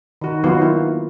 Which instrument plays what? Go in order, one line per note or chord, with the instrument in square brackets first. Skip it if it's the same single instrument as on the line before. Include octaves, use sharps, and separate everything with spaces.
[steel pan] D#3 F#4
D#3 F#3 B3 F4 F#4
A#3 E4 F4